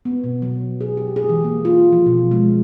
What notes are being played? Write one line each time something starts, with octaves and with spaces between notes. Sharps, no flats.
B3
B2
F#3
G#4
G4
G#4
E3
A#3
F4
F3
B2
G#3